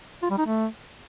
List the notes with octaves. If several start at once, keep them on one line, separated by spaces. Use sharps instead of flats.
F4
G3
D#4
A3